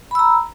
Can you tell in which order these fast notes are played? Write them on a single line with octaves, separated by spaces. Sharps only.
B5 E6 A#5